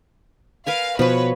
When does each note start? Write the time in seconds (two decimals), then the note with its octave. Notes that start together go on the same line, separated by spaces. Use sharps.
0.67 A#4 B4 F5 G#5
0.99 B2 F3 F#4 B4 C#5